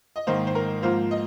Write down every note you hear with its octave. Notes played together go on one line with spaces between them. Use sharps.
D#5
G#2 D#3 A#3 D#4 C5
C5
A#4
G#2 F3 A#3 F4 C5
D#5